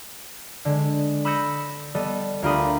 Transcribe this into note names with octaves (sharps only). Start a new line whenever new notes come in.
D3 G#3
B5 D#6 E6 G6 A#6 C#7
G3 B3 A4 D#5
D2 F4 G4 A#4 B5 D#6